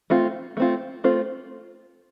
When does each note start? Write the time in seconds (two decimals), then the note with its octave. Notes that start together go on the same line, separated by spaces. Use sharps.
0.10 A3 C4 F4
0.57 A3 C4 F4
1.04 A3 C4 F4 C5